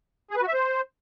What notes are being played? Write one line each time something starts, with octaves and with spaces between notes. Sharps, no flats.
G#4
B4
F#4
E5
C5